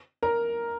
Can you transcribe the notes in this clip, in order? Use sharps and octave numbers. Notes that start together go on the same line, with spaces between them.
A#4 A#5